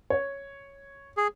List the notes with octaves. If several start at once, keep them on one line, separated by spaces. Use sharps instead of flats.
C#5
G#4